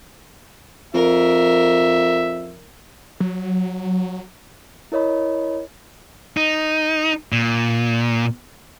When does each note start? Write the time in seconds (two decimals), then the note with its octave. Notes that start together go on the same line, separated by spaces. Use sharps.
0.94 F2 A#4 E5
3.20 F#3
4.92 E4 A#4 C#5 D#5 B5
6.37 D#4
7.32 A#2